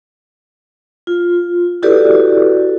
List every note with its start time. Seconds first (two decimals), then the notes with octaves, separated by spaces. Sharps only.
1.07 F4
1.83 E4 F#4 G4 A4 B4 D5